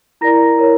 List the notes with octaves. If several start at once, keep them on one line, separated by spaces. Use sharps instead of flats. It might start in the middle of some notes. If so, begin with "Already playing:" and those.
E4 A#4 D5 A#5 A#6
E4 A#4 C#5